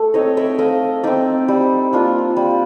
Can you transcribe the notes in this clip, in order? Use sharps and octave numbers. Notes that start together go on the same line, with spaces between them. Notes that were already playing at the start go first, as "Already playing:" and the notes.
Already playing: A3 A4
C4 D#4 C#5 D#5
D5 E5
A3 D#5 F5
C4 D#4 D5 E5
G3
A#3 D4 F4
G3